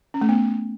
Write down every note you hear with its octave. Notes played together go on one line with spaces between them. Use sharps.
C#4
A3
B3